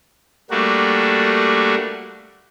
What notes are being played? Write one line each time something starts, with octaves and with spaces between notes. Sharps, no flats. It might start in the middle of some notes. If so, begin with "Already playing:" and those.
G3 A3 A#3 D4 F#4